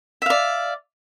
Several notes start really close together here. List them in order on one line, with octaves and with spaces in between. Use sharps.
E5 F5 D5